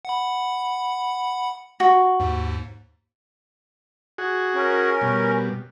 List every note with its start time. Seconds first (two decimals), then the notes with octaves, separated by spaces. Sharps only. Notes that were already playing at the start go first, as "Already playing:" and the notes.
0.05 F#5 B5
1.80 F#4
2.20 D#2 G#2
4.18 F#4 G#4
4.55 C#4 A#4
5.01 B2 G3